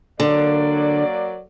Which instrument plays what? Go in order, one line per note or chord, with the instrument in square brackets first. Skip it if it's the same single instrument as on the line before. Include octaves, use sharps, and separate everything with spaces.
[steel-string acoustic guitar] D3 [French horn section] F#3 A#3 D5